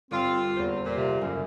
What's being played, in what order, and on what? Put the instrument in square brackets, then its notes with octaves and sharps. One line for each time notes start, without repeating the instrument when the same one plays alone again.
[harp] G1 D5 [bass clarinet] C4 [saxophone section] F4
[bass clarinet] E2 [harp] A#3 C#4 C5
[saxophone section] A#2
[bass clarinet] C3
[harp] F#1 [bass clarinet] F#2